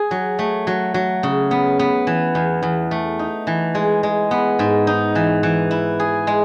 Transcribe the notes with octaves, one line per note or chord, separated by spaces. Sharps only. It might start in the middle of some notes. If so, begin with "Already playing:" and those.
Already playing: G#4
F#3
A3
F#3
F#3
C#3
B3
B3
E3
E2
E2
A3
D#4
E3
G#3
G#3
B3
G#2
D#4
E3
E3
E4
G#4
G#3